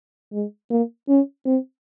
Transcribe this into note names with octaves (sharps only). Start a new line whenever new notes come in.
G#3
A#3
C#4
C4